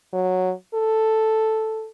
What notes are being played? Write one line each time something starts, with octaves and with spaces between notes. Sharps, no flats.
F#3
A4